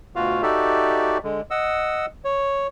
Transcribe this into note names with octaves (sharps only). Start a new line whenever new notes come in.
D2 B2 F4 F#4 F5
D#4 F#4 G4 A4 D5 E5
D3 G#3
D#5 F#5 E6
C#5